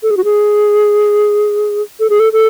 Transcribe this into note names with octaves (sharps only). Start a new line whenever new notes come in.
A4
G#4
F#4
G#4
A4
G#4
A4
A4